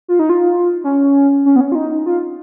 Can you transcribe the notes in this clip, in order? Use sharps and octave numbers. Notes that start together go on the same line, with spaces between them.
F4
D#4
F4
C#4
C#4
B3
C#4
F4
D#4
F4